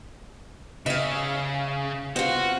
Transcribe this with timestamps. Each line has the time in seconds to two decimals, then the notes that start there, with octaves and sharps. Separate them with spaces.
0.86 C#3 E5 F5
2.16 C4 F4 F#4